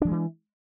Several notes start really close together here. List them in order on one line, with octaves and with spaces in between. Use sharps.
D4 F3 G#3 E3